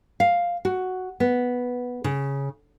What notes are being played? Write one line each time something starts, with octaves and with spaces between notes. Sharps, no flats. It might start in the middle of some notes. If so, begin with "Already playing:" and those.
F5
F#4
B3
C#3